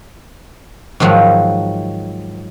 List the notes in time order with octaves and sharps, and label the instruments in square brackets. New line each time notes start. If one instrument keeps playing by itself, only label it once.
[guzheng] G#2 D#3 F3 F#3